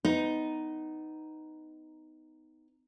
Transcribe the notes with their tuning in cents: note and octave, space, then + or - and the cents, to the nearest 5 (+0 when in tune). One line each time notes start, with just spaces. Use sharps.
B3 +25 D#4 +0